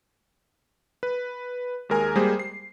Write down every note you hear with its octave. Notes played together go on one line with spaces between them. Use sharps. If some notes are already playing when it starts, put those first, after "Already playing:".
B4
D#2 G#3 A#4 G#5
G3 G#3 A#3 G#4 C5
C7